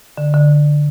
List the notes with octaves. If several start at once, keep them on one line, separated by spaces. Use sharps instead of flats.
D3
D3